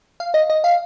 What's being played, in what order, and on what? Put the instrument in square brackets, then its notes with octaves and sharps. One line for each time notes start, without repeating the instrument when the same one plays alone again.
[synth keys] F5
D#5
D#5
F5